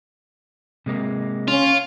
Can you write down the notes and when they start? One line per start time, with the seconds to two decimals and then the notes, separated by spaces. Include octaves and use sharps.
0.86 C3 G#3 A#3
1.48 C#4 F4